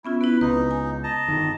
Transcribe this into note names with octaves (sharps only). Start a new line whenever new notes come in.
B3 C#4 E4 F4
B3 E4 B4
C#2 C4 D#4 B4
G#5
D#5 A5 A#5
G1 D#3